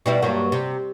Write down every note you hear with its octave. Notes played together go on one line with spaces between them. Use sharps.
B2 G3 E4
G2 F#3 A#3
C3